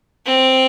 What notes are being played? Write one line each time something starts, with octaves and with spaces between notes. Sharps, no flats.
C4